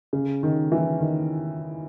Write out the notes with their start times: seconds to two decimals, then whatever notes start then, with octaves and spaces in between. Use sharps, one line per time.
0.13 C#3
0.43 D#3
0.72 E3
1.00 D#3